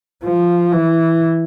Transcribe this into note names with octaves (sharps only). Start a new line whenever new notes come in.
F3
E3